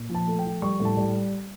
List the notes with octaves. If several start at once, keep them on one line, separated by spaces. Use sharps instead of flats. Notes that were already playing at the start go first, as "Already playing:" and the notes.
Already playing: A#2
F3 A5
A3
G5
F3
G3 C#6
A2
A5
G3